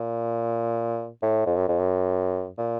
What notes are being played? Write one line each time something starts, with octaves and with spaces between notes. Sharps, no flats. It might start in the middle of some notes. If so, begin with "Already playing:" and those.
Already playing: A#2
A2
F2
F#2
F2
F#2
A#2